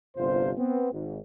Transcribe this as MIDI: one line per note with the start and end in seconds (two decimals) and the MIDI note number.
0.17 0.51 31
0.17 0.51 40
0.17 0.51 48
0.17 0.51 65
0.17 0.51 72
0.58 0.90 59
0.58 0.90 60
0.92 1.19 32
0.92 1.19 44